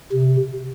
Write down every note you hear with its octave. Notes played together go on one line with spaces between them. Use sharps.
C3